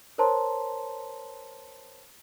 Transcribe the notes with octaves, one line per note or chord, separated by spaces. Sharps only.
A#4 C5 C#5 A5 A#5 C6